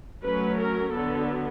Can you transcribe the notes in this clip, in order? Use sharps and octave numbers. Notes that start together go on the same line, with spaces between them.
F#3 A3 C#4 B4
A#4
D3 F#3 B3 A4